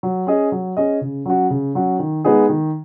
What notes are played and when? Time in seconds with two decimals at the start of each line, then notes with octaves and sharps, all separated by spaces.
0.03 F#3
0.27 C#4 G#4 D#5
0.52 F#3
0.77 C#4 G#4 D#5
1.01 C#3
1.26 F#3 C#4 F#4
1.50 C#3
1.75 F#3 C#4 F#4
1.99 D#3
2.25 G#3 B3 D#4 G#4
2.49 D#3